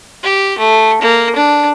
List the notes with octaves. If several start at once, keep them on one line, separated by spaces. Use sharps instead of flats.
G4
A3
A#3
D4